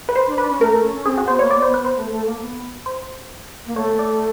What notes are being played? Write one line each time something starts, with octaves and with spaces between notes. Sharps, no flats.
B4
C5
D4
D4 B4
C#4
A3 A#4
A3
C#4
C#4
C4 G#4
F#4
B3 C5
A#3 C#5
B3 D5
C5
B3
B4
B3 C5
A3
A3
A#3
B3
C5
A#3
A3 C#5
D5